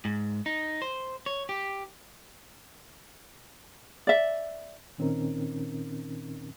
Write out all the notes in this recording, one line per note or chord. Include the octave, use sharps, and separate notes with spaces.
G#2
D#4
C5
C#5
G4
D5 E5
A#2 D#3 C4 C#4 D#4 A#4